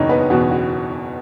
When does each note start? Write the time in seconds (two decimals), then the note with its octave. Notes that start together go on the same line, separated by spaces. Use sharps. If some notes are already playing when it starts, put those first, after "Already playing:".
Already playing: F#1 E2 B2 D#4 C#5 D#5
0.09 B3 B4
0.30 E2 B2 F#4
0.51 F#4